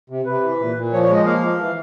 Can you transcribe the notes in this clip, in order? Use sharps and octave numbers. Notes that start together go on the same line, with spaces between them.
C3
C3 B4
E3
A#2
A#2
F3 C#5
C#5
G#3 D#5
A#3 F5
F3
E3